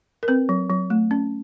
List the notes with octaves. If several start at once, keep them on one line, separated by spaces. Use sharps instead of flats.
A#4
C4 B4
F#3
F#3
A3
C#4